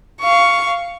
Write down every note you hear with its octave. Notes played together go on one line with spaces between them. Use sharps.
F5 C#6